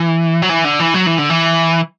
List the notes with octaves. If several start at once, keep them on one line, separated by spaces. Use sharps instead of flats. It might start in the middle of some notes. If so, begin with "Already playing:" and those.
Already playing: E3
F#3
E3
D3
E3
F#3
E3
D3
E3